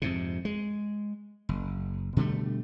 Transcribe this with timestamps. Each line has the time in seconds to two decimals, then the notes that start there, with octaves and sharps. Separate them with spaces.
0.02 F2 G#2 C3
0.45 G#3
1.49 F#1
2.17 B2 D3 G3 A3